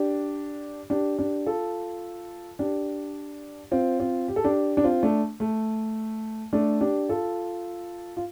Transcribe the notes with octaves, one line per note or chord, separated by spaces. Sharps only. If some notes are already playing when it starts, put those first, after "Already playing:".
Already playing: D4 G4
D4 G4
D4 G4
F4 A4
D4 G4
C4 F4
C4 F4
G4
A4
D4 G4
D4
C4 F4
A3 D4
A3
A3 D4
D4 G4
F4 A4
F4